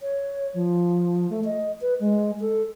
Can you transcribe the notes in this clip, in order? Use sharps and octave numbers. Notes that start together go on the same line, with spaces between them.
C#5
F3
A3
D#5
B4
G#3
A4